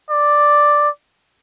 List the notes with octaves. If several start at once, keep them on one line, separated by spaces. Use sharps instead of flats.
D5